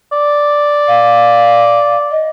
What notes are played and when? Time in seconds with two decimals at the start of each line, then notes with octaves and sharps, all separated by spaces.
0.12 D5
0.88 F5
2.11 D#5